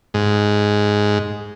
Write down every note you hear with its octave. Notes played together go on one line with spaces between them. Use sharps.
G#2